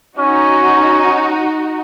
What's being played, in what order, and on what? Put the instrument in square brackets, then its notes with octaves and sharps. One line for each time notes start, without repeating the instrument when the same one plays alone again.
[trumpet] C#4 [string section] D#4 F#4